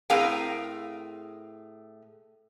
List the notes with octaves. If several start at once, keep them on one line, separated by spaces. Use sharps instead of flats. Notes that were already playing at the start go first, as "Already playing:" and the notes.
A2 C4 G#4 A#4 F5 G5